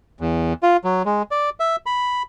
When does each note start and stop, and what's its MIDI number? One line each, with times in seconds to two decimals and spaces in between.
0.21 0.53 40
0.63 0.77 65
0.84 1.02 54
1.05 1.22 56
1.31 1.50 74
1.60 1.76 76
1.86 2.23 83